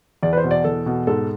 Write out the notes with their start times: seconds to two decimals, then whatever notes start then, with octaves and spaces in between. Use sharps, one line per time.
0.23 E2 D5
0.33 B4
0.37 C5
0.44 B2
0.51 D5
0.64 E2 A4
0.86 B2
1.07 G#2 A4